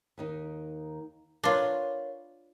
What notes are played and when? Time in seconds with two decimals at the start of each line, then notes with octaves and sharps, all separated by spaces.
0.18 D#2 D#3 D#4
1.44 D4 F4 A#4 B4 C#5